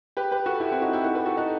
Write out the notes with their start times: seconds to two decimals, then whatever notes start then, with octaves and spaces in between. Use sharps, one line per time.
0.17 G4 B4
0.31 G4 B4
0.46 F#4 A4
0.60 E4 G4
0.71 C4 E4
0.82 D#4 F#4
0.93 E4 G4
1.04 F#4 A4
1.15 G4 B4
1.26 F#4 A4
1.37 D#4 F#4